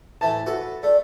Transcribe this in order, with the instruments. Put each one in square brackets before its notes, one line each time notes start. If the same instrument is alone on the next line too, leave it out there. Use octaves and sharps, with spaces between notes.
[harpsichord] A2 E3 A3 [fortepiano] A5
[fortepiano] F#4 [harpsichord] A4 B4
[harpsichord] A3 [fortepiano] A4 [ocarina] D5